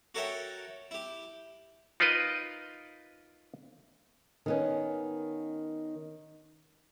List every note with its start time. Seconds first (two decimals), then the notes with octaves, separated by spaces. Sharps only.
0.15 F#4 A4 A#4 C#5 E5 G5
0.91 E4 G4
2.00 D#4 F4 A#4 B4 D#5
4.46 D#3 B3 C#4